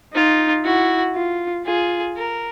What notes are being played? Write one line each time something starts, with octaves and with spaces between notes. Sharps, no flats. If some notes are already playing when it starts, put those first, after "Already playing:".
D#4 F4
E4 F#4
F4
F4 G#4
A#4